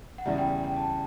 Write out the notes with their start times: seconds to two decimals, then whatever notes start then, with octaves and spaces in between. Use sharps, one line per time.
0.18 F#5
0.26 E2 C#3 G3 E5
0.38 G5
0.64 G5
0.76 A5